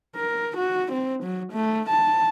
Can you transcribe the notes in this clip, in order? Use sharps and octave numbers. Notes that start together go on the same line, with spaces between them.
A#4
F#4
C4
F#3
A3
A5